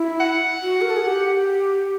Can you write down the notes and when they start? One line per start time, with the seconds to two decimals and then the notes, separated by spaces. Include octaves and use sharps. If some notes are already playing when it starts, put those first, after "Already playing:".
Already playing: E4
0.20 F#5
0.62 F#4
0.81 A#4
0.90 A4
0.96 G#4
1.04 G4